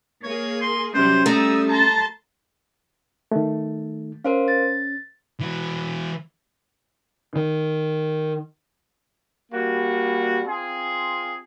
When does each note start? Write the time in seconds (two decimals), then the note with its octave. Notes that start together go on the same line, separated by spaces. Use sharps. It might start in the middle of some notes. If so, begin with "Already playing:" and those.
0.23 A#3 G#4 C#5
0.61 C6
0.94 C3 F#3 G3 C#4 C5
1.26 G3 A3 A#5 D#6 E6
1.68 A5 A#5 C6
3.31 D#3 A3
4.25 C#4 A#4 C5 F5
4.48 A6
5.40 E3 F#4
7.35 D#3
9.52 G3 A#3 F#4
10.46 C4 F4 G#4